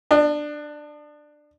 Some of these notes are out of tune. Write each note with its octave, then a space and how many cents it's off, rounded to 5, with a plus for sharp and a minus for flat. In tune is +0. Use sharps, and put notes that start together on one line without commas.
D4 +15 D#5 -40